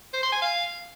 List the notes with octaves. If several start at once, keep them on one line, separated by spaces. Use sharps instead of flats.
C5
C6
G#5
F5